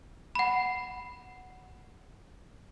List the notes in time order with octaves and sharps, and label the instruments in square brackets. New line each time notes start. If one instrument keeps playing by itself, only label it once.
[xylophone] F#5 B5